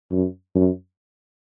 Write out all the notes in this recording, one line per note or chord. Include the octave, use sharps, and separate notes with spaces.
F#2
F#2